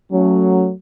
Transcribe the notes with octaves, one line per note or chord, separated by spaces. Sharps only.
F#3 A3 C#4